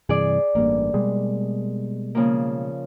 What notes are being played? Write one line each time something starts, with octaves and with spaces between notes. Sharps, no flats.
G2 C3 E3 G#4 D5
A1 G2 A#3
B2 G3 G#3
C#3 F3 A#3